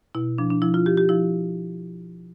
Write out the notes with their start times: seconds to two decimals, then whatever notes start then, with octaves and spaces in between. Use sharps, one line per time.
0.15 B2 E4
0.38 F3 D4
0.50 D4
0.62 F3 E4
0.74 F4
0.86 F3 G4
0.97 G4
1.09 F3 E4